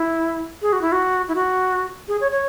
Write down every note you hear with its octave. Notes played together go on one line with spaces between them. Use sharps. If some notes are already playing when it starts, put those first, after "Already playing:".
Already playing: E4
G#4
F#4
E4
F#4
E4
F#4
G#4
C#5
C#5